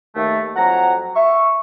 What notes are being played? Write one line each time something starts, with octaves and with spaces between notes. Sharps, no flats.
D#2 A3
F2 F#3 F#5 A#5
E5 C#6